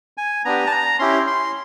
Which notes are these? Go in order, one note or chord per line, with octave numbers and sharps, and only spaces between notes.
G#5
B3 D4 G4 A#5
A5
A#5
C#4 E4 G4 C6
C6